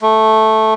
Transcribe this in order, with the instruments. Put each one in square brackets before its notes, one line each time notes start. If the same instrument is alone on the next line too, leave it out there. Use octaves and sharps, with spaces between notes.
[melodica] A3